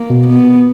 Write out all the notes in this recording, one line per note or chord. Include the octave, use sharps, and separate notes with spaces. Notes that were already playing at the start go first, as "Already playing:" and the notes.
Already playing: A#3
B2
B3